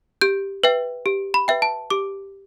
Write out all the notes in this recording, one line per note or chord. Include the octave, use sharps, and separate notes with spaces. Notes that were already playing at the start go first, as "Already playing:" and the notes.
G4 G6
B4 E5 G5
G4
B5
B4 E5 G5
A5
G4 D6